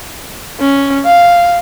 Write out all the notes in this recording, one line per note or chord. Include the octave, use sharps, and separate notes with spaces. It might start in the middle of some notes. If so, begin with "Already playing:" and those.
C#4
F5